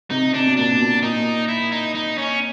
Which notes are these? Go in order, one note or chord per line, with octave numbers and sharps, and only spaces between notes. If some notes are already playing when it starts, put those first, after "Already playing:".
C3 D#4
C3 D4
B2
A#2 D4
B2
A#2 D#4
E4
D#4
D#4
C#4